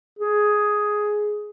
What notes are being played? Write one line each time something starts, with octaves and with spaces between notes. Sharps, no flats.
G#4